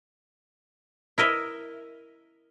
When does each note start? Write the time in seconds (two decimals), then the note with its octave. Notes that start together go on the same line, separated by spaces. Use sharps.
1.18 E4 A#4 D#5 E5